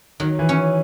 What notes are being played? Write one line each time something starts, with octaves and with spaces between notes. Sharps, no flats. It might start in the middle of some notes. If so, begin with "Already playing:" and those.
D#3 F#3
E3
C#4